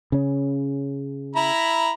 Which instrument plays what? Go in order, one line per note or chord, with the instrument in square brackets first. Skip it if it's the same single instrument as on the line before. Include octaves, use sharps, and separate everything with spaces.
[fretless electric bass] C#3 C#4
[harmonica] E4 A#5 B5